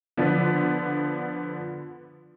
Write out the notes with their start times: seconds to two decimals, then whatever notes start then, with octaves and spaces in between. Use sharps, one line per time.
0.17 D3 F3 B3